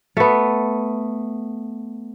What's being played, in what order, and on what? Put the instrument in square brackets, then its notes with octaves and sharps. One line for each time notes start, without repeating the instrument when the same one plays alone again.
[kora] A3 B3